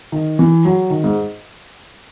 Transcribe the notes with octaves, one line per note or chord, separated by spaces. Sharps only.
D#3
E3
F#3
D#3
G#2